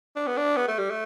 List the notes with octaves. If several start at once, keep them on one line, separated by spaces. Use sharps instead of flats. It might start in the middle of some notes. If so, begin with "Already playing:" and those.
D4
B3
D4
B3
A3
G3
A3